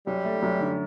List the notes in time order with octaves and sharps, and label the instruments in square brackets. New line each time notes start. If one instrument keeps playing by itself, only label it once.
[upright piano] F#2 [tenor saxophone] G3
[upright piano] A3
F#2
D3